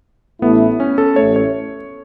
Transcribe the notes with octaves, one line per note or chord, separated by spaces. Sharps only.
A1 A2 A3 B3 E4
C#4
A4
A1 A2 A3 C#5
C#5